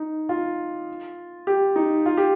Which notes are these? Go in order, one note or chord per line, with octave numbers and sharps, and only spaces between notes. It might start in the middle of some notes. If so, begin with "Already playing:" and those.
Already playing: D#4
F4
G4
D#4
F4
G4